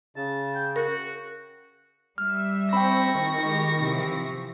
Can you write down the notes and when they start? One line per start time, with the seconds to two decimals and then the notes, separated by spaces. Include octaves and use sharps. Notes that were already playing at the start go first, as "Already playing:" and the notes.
0.16 C#3 A5
0.54 G5
0.76 F#4 A#4
2.18 G3 E5 F6
2.73 C4 G5 B5 C#6 A#6
3.15 D#3
3.45 G#3 G4
3.79 C3 E3 F3